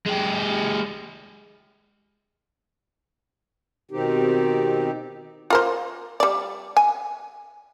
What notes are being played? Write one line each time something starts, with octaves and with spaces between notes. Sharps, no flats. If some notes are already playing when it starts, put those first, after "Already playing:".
G#3 G4
B2 D#3 C4 D#4 G4
F4 A#4 C5
G3 D5
G#5